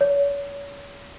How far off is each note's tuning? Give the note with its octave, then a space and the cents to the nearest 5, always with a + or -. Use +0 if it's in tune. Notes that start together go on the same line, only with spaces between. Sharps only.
C#5 +35